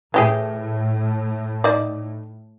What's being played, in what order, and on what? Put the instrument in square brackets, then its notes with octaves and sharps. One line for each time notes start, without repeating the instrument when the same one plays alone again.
[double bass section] A2 [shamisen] E3 G4 G#4
[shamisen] D#4 D5